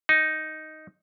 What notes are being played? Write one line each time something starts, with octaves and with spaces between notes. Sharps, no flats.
D#4